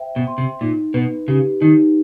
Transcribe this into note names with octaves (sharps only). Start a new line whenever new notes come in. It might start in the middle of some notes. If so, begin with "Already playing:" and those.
Already playing: C5 E5 G5
B2
C6
C3
A#2 D#4
B2 B4
C#3 G4
D#3 D#4